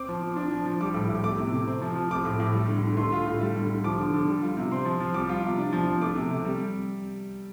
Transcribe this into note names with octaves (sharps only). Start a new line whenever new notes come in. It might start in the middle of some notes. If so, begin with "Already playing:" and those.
Already playing: C4 D6
F3
F3
D4
F3
F3
G3 D6
A2
A2
A3 D6
C3
C3
C4
F3
F3
A3 D6
A2
A2
G3
D3
D3
A3 C6
F4
A2
G3
D3
D3
F3 D6
D3
D3
G3
F4
C3
C4 C6
F3
F3
G3 D6
F4
C3
D4
F3
F3
A3 D6
C3
C3
G3